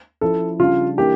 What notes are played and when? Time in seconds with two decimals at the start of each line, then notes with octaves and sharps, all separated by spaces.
0.21 F3 C#4 E4 A4
0.59 C#3 G3 D4 F4
0.97 E3 A#3 D4 G4